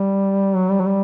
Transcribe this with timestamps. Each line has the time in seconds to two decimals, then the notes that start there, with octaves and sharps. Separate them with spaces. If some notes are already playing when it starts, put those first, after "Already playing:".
Already playing: G3
0.56 F#3
0.72 G3
0.80 F#3
0.87 G3